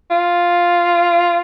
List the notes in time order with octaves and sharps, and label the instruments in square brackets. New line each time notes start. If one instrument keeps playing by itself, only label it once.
[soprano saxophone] F4